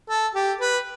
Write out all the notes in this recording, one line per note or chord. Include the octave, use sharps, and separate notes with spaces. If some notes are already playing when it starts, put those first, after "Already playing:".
A4
G4
B4